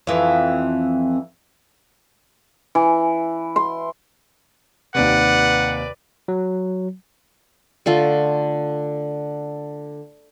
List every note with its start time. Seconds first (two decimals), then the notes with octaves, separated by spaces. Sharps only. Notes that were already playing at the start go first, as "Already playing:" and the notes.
0.07 F2 E3
2.75 E3
3.56 C6
4.95 D#2 C3 B4 D5 F#5
6.28 F#3
7.86 D3 A3 F4 A4